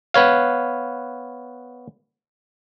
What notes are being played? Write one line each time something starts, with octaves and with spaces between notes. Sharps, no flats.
B3 B4 C#5 F5